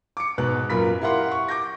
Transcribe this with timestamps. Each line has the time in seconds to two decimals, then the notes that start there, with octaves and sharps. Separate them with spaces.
0.17 D6 C#7
0.38 G#2 B2 B4 F#6
0.70 F#2 A#2 A#4 B5 B6
1.01 E4 G4 A#4 F5 F#5 C6
1.31 C#6
1.48 D6 G6 A#6